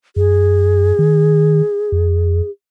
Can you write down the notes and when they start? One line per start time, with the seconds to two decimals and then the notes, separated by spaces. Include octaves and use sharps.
0.16 F#2 G#4
0.99 D#3
1.92 F2